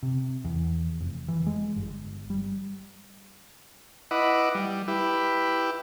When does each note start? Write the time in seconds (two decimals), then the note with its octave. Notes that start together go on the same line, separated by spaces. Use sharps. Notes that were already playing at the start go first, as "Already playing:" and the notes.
0.03 C3
0.45 E2
1.00 F1
1.28 E3
1.47 G#3
1.76 G1
2.30 G3
4.11 E4 B4 D#5 F#5 D6
4.55 G3
4.88 E4 G4 B4